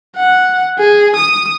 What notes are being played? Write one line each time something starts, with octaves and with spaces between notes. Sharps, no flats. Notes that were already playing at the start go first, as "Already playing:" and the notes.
F#5
G#4
D#6